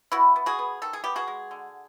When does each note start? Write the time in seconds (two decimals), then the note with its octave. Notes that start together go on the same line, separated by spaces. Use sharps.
0.12 B3 E4 F#4
0.36 B3
0.46 F#4 G#4
0.59 B3
0.82 D#3 A4
0.93 G#4
1.04 B3 G4
1.16 F#4 G#4
1.28 G#3
1.51 D3